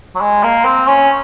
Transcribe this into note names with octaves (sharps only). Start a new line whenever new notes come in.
F#3
G#3
A#3
C4
C#4